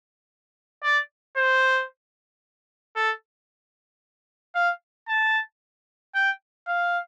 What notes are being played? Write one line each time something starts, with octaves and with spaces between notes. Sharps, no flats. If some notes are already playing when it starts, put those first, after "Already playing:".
D5
C5
A4
F5
A5
G5
F5